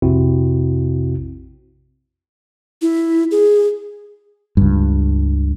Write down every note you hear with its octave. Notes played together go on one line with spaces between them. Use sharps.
A#1 F2 C3 C4 E4 F#4
E4
G#4
C#2 G2